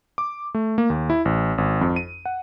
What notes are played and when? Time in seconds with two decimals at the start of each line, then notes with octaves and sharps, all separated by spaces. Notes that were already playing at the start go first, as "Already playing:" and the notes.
0.18 D6
0.54 A3
0.78 A#3
0.90 D#2
1.10 E4
1.25 A1
1.58 G#1
1.81 F2
1.96 D#7
2.25 F#5